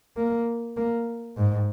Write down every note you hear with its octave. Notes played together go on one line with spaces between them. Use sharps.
A#3
A#3
G#2